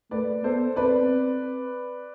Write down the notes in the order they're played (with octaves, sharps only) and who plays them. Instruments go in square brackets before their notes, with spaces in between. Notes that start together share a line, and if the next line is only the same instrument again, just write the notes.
[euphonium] A3 [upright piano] B4 D5
[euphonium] B3 [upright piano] A4 C5
[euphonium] C4 [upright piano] B4 D5